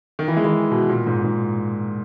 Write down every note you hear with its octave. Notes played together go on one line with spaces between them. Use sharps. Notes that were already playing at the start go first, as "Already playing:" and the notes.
D#3
E3
G#3
E3
B2
A#2
G#2
G#2